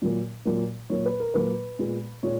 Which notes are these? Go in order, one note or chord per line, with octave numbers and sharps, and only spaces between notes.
A#2 F#3 A#3
A#2 F#3 A#3
A#2 F#3 A#3 C#5
B4
A#4
A#2 F#3 A#3 B4
A#2 G#3 B3
A#2 G#3 C#5